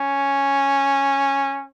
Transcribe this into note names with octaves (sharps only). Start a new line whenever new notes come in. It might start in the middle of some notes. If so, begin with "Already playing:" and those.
Already playing: C#4